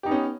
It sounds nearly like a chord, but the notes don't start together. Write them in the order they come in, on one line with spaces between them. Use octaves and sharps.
G4 D#4 B3 C#4